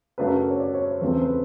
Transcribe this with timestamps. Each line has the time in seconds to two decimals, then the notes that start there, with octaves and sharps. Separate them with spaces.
0.18 F#2 C#3 F#3 A3 D4 B4
0.29 A#4
0.50 C#5
0.59 D5
0.74 C#5
0.87 C5
1.01 E2 C#3 F3 A3 C4 B4
1.12 C5
1.22 B4